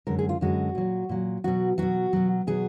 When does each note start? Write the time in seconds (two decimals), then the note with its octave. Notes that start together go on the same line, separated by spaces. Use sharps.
0.07 F#2 D3 G#3 A#4
0.19 G#4
0.29 F4
0.41 F#2 D3 G#3 F#4
0.75 A#2 F#3
1.09 A#2 F#3
1.44 B2 F#3 F#4
1.78 B2 F#3 F#4
2.13 B2 F#3
2.47 B2 F#3 G#4